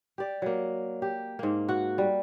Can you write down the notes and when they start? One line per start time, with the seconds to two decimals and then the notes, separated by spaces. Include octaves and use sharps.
0.18 G4 D5
0.42 F#3 A#3
1.02 G4
1.39 G#2 A#3
1.69 F#4 F#5
1.98 G3